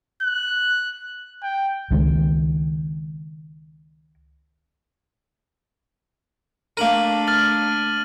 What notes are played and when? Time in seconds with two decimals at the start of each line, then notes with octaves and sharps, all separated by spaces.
0.23 F#6
1.43 G5
1.91 C#2 D#3 G#3
6.77 A3 A#3 D4 A#4 D#7 F#7
7.27 F6 A6 F#7